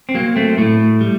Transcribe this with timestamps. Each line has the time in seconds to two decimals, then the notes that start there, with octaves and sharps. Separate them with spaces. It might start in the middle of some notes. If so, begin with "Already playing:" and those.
0.09 C4
0.14 F#3 A#3
0.36 A3 C4
0.58 A2 A3
1.01 G3